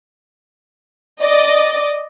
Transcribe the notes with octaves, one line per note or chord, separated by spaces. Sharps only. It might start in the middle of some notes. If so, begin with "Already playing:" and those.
D5 D#5